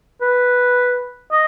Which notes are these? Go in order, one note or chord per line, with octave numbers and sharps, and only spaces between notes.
B4
D#5